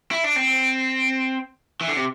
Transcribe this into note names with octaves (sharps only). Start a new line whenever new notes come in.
E4
D4
C4
E3
D3
C3